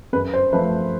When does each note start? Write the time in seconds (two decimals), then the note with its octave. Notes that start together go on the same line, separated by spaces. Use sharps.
0.13 F#2 B4
0.33 C5
0.53 F3 A3 B4